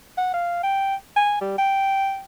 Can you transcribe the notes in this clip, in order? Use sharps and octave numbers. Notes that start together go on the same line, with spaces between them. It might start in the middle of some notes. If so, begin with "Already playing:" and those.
F#5
F5
G5
G#5
G3
G5